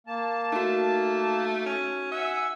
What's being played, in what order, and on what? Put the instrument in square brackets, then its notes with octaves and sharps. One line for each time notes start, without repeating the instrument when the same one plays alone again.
[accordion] A#3 A5
[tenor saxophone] A3 [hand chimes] D#4 F#4
[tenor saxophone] C#4
[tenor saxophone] E5 [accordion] F#5 G#5